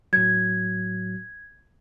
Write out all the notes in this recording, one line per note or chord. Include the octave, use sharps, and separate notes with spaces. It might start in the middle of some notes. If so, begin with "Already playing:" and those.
A2 F#3 G#6